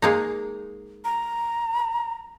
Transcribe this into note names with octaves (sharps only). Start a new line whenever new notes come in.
G#3 A#3 D#4
A#5